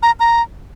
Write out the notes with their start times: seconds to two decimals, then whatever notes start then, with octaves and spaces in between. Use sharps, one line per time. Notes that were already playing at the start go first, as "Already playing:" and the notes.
0.03 A#5
0.20 A#5